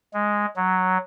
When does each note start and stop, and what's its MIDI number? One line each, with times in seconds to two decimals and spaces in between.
0.13 0.46 56
0.56 0.98 54